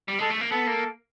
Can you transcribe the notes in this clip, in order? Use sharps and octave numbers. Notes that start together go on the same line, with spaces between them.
G3
G#3 A4
A3
A#3
B3 A4
A#3